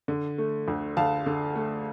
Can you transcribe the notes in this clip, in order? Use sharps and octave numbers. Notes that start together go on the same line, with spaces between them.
D3
A3
D2
D2 F5 A5
D3
A3